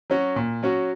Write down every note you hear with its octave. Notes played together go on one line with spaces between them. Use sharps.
F#3 C#4 F#4
A#2
F#3 C#4 F#4